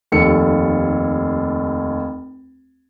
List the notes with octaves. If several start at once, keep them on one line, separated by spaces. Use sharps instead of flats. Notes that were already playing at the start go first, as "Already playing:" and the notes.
F1 D#2 A4 C#7